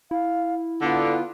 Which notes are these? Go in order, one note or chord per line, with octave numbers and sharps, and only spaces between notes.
E4 F5
D3 B3 F4